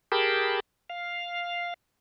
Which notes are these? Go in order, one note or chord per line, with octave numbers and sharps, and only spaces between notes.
G4 G#4 A#4 G5 A5 B5
F5